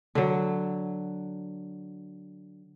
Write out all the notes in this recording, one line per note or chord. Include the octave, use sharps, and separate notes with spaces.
D3 F#3